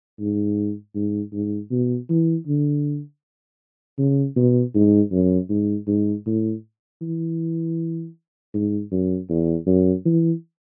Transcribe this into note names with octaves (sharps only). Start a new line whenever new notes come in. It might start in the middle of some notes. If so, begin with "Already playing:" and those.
G#2
G#2
G#2
B2
E3
D3
C#3
B2
G#2
F#2
G#2
G#2
A2
E3
G#2
F#2
E2
F#2
E3